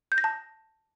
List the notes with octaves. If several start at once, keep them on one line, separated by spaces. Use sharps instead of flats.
G6
A#6
A5